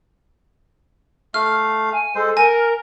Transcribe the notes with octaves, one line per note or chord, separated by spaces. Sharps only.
A3 F5 F6
G#5
G#3 A4 C5
A#4 G#5 A#5